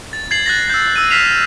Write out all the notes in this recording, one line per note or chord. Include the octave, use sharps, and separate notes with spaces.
A6
G#6 A6 C7 F#7
F#6 A6 A#6
E6 G6
E6 D#7
F6 B6 C7 E7 F7